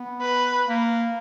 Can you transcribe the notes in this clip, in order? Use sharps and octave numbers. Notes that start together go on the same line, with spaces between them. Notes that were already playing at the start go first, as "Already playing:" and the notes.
Already playing: B3
B4
A#3